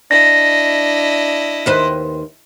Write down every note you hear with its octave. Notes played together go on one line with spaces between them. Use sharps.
D4 E4 D#5 A#6
D#2 B4 C5